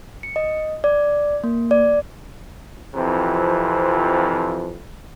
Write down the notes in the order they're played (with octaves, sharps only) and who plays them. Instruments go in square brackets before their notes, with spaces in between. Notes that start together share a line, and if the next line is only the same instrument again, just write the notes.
[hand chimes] C#7
D#5
D5
A#3
D5
[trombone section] F2 C3 E3 F3